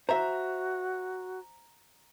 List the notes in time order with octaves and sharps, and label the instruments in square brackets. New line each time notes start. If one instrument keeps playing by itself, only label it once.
[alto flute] F#4 [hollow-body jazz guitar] C5 E5 [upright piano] A#5